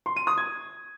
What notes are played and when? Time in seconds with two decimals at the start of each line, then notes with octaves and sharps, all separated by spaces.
0.06 C6
0.16 D#7
0.27 D#6
0.38 G#6